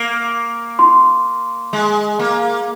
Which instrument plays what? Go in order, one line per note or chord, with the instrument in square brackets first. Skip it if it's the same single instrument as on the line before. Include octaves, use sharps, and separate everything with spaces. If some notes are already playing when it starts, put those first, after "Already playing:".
Already playing: [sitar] A#3
[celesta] C6
[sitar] G#3
A#3